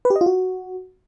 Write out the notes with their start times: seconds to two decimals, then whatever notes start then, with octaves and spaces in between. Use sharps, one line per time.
0.05 B4
0.10 G4
0.16 D#5
0.21 F4
0.26 F#4